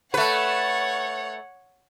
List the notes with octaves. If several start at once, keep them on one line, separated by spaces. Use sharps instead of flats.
A3 B4 C#5 F#5